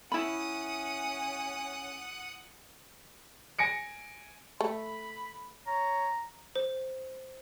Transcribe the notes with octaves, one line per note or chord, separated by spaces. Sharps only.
C#4 E4 F#5 B5 D#6
G#5 A#6 C#7 D7
A3 B5
C#5 A#5
C5